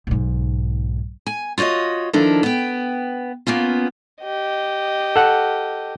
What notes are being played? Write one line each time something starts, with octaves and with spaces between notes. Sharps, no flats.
B1 G#2
G#5
F4 F#4 C5 C#5 D#5
D#3 F3 D4 E4 A4 A#4
B3 G5
A#3 B3 C#4 F4
G4 D#5
A4 F#5